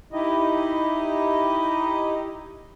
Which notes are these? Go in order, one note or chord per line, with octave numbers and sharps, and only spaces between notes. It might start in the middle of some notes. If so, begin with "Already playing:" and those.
D#4 E4 G4 D#5